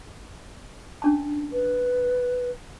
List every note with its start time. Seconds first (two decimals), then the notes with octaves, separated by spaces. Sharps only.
1.02 C#4 D4 A5
1.52 B4